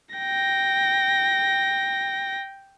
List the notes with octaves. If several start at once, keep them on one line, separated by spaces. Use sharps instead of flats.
G5 A#6